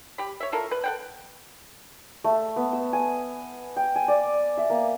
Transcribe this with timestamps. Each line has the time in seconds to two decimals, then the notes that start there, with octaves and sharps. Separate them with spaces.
0.18 G4 B5
0.40 C#5 E5
0.52 E4 F4 A4 A#4
0.71 B4
0.84 A4 F#5 G5
2.24 A3
2.56 B3
2.73 E6
2.93 G#5
3.76 G5
3.96 G#5
4.08 D5
4.57 E5
4.70 A#3